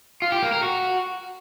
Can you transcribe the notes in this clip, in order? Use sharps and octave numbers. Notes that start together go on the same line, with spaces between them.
F4
G4
A#3
A#4
F#4